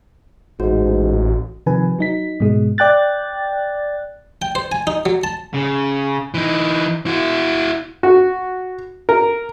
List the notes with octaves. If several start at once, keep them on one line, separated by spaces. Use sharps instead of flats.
A1 G#2 F#4
C3 D#3 F3 B4 G#5
F#3 D#4 B6
G#2 B2 G#3
D5 G5 F#6 A6
G5
C5
G#5
D#4
F#3
A5
C#3
E3 D#4
E4 F#4
F#4
A#4